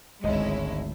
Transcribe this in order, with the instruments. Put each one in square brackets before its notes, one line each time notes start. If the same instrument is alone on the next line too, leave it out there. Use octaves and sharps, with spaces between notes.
[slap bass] D1 D2 [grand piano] G#1 D#5 [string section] G#3 C#4 E4